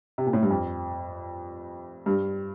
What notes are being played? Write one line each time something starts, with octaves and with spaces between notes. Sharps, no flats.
C3
A#2
A2
G2
F2
G2